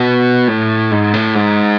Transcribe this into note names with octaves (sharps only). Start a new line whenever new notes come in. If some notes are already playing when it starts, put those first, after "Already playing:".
Already playing: B2
A2
G#2
A2
G#2